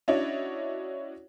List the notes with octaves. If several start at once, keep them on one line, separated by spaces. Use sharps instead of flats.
C#4 D4 E4 F#4 C#5 D#5